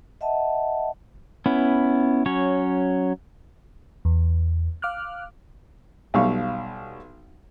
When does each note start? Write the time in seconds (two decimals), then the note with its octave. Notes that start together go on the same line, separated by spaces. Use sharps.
0.21 D#5 E5 F#5 A5
1.46 B3 C#4 E4
2.26 F#3 C#4 C#5
4.05 E2
4.82 F5 D6 F6 F#6
6.14 B1 G3 E5 F5 C#6